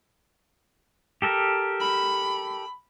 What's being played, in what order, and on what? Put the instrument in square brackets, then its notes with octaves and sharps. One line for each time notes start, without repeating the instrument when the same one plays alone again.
[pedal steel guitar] G4 A4 A#4
[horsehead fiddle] B5